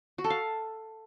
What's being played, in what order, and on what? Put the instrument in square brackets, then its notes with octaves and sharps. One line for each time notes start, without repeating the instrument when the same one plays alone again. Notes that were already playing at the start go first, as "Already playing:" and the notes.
[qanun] F#4
A4
F5